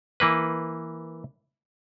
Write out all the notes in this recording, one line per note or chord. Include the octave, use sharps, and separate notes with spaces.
E3 A#3 B4